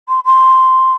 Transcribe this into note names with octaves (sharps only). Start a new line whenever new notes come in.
C6
C6